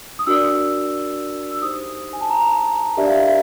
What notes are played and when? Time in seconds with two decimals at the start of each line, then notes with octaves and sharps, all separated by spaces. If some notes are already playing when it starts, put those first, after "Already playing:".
0.19 D#6
0.27 D4 F#4 A#4 D5 E6
1.51 E6
1.61 D#4 G4 C5 D#6
2.13 G#5
2.21 A5
2.30 A#5
2.97 D4 G4 A#4 D5 E5
3.06 F5
3.15 E5